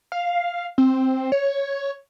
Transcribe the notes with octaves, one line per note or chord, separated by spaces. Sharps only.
F5
C4
C#5